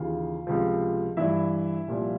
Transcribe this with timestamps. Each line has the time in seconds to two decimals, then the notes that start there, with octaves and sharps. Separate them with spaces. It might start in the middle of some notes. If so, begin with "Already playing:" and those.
Already playing: D#2 C#3 E3 F4 F5
0.47 C#2 C3 F3
1.17 G2 E3 E4 E5
1.88 C2 A#2 F3